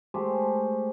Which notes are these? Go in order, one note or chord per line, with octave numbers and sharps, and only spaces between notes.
G#3 A3 G4 C5